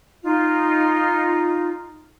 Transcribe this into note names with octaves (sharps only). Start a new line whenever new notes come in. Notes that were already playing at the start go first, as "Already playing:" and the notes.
D#4 F4